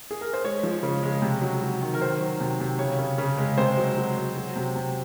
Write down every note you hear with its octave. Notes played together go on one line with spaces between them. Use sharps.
G#4
A#4
C5
G#3 C#5
F3
C#3
G#3
C3
F#3
F#3
D#3
A#4
D#3 C5
F#3
C3
C3
C#3 C#5
C#3
C#3
G#3
C3 C5
F#3
F#3
F#3
F#3
C3
C3